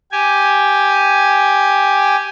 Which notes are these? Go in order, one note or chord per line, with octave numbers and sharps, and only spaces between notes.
G4 G#5